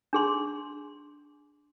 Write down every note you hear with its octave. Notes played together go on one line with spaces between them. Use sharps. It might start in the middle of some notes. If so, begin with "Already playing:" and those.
D4 G#4 C6